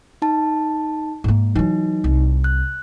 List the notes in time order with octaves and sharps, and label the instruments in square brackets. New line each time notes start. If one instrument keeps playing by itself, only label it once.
[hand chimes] D#4 A5
[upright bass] G#2 A#3
[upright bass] E3 F#3 [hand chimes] D#4
[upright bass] C2
[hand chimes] F#6